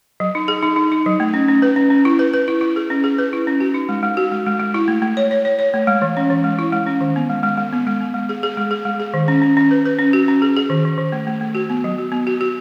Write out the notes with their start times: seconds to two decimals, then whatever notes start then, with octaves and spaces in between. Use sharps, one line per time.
0.20 F#3
0.35 D#4
0.48 G#4
0.63 D#4
0.76 D#4
0.92 D#4
1.06 F#3
1.20 A3
1.34 C#4
1.48 C#4
1.62 B4
1.76 C#4
1.90 C#4
2.05 E4
2.19 B4
2.33 B4
2.48 E4
2.61 E4
2.76 G#4
2.90 C#4
3.04 G#4
3.18 B4
3.33 E4
3.47 C#4
3.60 F#4
3.74 D#4
3.89 G#3
4.03 G#3
4.17 F#4
4.32 G#3
4.46 G#3
4.60 G#3
4.74 E4
4.88 A3
5.02 A3
5.17 C#5
5.31 C#5
5.45 C#5
5.59 C#5
5.74 A3
5.87 G#3
6.02 E3
6.17 C#4
6.30 E3
6.44 G#3
6.59 E4
6.72 G#3
6.86 C#4
7.01 D#3
7.16 B3
7.29 G#3
7.43 G#3
7.57 G#3
7.73 B3
7.87 G#3
8.01 B3
8.14 G#3
8.29 G#4
8.43 G#4
8.57 G#3
8.71 G#4
8.85 G#3
9.00 G#4
9.14 D#3
9.28 C#4
9.42 C#4
9.57 C#4
9.71 B4
9.86 B4
9.99 C#4
10.13 F#4
10.28 C#4
10.42 G#4
10.57 G#4
10.70 D#3
10.85 D#3
10.98 D#3
11.12 A3
11.27 A3
11.41 A3
11.55 F#4
11.70 B3
11.84 F#3
11.98 F#4
12.12 B3
12.27 F#4
12.41 F#4